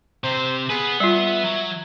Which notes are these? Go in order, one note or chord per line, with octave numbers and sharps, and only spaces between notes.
C3 C5
B3 G#4 B4
G3 F4 E5
F#3